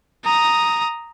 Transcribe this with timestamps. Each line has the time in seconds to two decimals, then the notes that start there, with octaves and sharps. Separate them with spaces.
0.25 A#5 D#6